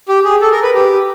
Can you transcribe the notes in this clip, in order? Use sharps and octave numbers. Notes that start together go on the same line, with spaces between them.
G4
G#4
A4
A#4
B4
G4